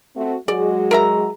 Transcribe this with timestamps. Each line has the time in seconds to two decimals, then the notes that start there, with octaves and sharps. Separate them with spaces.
0.16 A3 C4 F#4
0.48 F#3 G#3 F#4 G#4 D5
0.91 A#4 E5 A#5